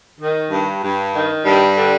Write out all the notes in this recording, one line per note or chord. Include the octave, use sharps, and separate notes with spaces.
D#3
G2
G2
D#3
G2 G3
D3